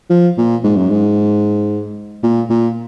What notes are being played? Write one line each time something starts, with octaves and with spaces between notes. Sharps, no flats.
F3
A#2
G#2
F#2
G#2
A#2
A#2